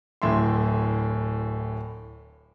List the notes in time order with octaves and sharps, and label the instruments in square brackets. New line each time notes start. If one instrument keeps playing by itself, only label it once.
[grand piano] D1 A2 E5 C6